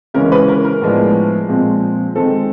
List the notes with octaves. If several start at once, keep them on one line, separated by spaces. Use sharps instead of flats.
C#3 E3 G#3 C#4 A#4
B4
A#4
A#4
A2 F3 G#3 B3 D4
A#2 F3 G#3 C4
D#3 G#3 C4 A4